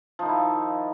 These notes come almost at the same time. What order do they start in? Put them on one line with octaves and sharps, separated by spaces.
F3 D#4 D#3 E4